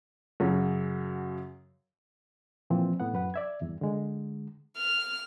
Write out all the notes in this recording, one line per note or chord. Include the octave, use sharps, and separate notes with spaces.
F#2 C#3 F#3
A#2 E3 F3 C4
A2 B3 F#5
F#2 B4 F#5
D5 E5 G#6
E2 G2
D3 G#3
F6